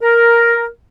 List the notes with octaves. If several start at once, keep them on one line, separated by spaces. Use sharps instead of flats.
A#4